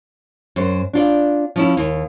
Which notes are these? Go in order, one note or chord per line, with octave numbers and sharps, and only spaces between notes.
F#2 C5
D4 F4 D5
F3 C#4 E4
D#2